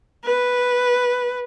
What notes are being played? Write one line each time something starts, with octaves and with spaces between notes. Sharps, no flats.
B4